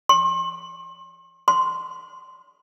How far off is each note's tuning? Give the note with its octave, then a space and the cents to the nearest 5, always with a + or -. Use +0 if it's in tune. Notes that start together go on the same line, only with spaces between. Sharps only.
C6 +35
C6 -10